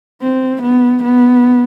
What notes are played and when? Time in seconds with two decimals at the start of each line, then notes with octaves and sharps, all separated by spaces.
0.22 C4
0.62 B3
1.03 B3